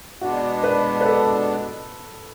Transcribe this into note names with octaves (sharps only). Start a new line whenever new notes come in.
B2 G#3 B3 D4 F#4
B4
B4
A4